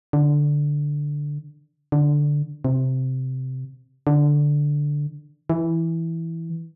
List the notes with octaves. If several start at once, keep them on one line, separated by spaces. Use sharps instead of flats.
D3
D3
C3
D3
E3